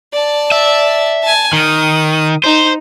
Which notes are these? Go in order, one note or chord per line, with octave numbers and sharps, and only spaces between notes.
D5 A5
E5
G#5 A5
D#3 D#6
D#4 C5